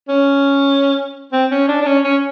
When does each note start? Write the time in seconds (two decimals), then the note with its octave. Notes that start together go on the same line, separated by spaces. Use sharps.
0.08 C#4
1.32 C4
1.51 C#4
1.69 D4
1.82 D4
1.86 C#4
2.05 C#4